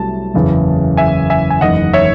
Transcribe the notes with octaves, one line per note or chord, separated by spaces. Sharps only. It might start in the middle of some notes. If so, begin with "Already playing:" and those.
Already playing: C2 C3 F#3 A3 A5
F#1 E2 C#3 E3
E5 G#5
E5 G#5
G#5
F#1 E2 D#3 D#5 F#5
C#5 E5